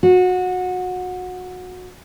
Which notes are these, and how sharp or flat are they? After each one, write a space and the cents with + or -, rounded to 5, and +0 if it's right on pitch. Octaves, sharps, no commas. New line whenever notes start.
F#4 -20